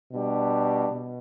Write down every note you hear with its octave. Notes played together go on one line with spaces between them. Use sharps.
B2 G3 D4 G4
B2